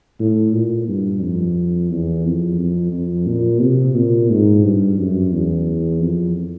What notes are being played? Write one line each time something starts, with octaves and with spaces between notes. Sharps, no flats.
A2
A#2
G2
F2
E2
F2
F2
F2
A#2
C3
A#2
G#2
G2
F#2
E2
F2